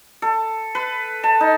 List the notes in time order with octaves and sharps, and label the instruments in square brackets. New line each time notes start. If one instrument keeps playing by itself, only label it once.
[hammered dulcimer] A4
B4
A5
D#4